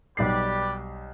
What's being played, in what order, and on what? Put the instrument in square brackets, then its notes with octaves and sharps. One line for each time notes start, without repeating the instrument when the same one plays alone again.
[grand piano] B1 G3 C7 [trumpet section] G4 B4 D5